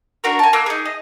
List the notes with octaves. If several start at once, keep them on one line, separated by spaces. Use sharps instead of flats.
D4 F#4 A#4
G#5 A5
A#3 E6 F#6
D#4 G#4
D#5